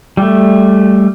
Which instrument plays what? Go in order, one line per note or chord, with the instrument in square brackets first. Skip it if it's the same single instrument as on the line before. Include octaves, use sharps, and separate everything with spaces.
[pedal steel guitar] G3 A3